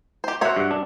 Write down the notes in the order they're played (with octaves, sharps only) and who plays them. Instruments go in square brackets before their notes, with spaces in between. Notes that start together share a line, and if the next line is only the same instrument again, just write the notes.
[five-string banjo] G4 C5
[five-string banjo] F#4 C#5 E5 [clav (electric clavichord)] C5 F#5
[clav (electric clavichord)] G2 F#5
D4